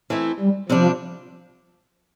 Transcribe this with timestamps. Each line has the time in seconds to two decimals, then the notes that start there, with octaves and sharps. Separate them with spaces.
0.10 E3 A3 C4 E4
0.40 G3
0.69 C3 F3 G3 D4